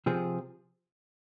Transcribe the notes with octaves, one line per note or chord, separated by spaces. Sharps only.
C3 F3 C4 G#4